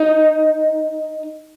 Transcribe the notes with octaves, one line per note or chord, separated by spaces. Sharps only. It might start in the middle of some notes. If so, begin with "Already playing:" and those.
Already playing: D#4